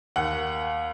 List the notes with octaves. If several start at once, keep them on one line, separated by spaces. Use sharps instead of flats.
D#2 F#5